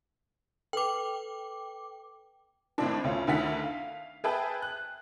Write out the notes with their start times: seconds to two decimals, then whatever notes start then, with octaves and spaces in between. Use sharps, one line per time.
0.73 A4 B4 G5 D6 F7
2.78 G#1 A2 C4 D4
3.04 D2 C#4 F4
3.27 D2 D3 D#3 E4 F#5 B6
3.64 F5
4.24 G#4 B4 E5 G5 A5
4.62 F#6